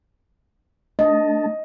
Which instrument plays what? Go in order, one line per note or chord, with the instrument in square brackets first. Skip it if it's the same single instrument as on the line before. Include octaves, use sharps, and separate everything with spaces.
[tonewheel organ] A3 D4 A5 [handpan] D#5